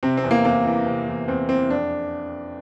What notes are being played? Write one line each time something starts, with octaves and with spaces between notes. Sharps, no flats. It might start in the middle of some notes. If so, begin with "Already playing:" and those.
C3 C4
C4
E2
A#3
E2 A#3
E3
C3
E2
E2 C4
E3 C4
F2 D4